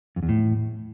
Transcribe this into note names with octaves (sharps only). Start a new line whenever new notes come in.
F2
E2
A2